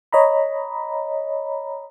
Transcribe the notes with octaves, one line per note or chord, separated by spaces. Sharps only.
C#5 D#5 A#5 B5